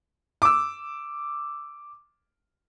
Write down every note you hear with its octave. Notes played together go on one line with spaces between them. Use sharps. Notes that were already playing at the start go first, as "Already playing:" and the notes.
D6 E6